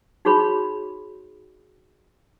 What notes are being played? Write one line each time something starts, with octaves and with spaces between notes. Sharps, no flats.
D#4 F#4 G#4 C#5 B5